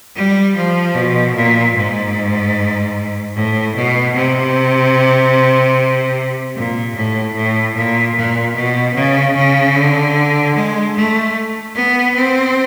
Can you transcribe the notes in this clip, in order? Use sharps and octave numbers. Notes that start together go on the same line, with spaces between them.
G3
F3
B2
A#2
G#2
A2
B2
C3
A#2
A2
A2
A#2
A#2
B2
C#3
C#3
D3
G#3
A3
B3
C4